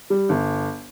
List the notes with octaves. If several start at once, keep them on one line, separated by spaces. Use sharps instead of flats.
G3
G1